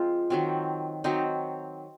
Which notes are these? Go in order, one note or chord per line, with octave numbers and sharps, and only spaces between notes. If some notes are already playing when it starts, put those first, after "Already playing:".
Already playing: F3 G#3 C4 F4
D#3 F#3 C4
D#3 F#3 C4 D#4